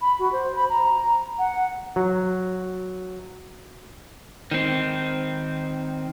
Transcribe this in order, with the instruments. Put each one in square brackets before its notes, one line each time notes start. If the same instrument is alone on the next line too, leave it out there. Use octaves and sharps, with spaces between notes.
[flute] B5
F#4
C5
B5
A#5
F#5
[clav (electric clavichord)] F#3
[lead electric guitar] D#3 C4